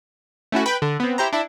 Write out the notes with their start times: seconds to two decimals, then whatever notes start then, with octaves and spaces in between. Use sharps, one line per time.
0.52 A3 C#4 E4 F#4
0.66 B4 G5 B5
0.82 D3
1.00 B3 C4
1.18 E4 G4 C5 A#5
1.33 D4 E4